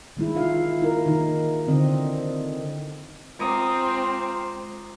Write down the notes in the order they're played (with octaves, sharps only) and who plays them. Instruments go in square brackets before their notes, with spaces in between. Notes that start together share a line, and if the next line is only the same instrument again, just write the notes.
[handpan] D#3 G#3 E4
D#4 F4 F5
E4 A#4
D#3 D#4
D3 C4 D#5
[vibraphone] G#3 [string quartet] C4 [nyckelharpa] F4 C5 [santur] A#5 D6 D#6